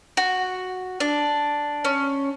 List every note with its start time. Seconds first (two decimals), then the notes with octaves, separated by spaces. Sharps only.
0.17 F#4
1.00 D4
1.85 C#4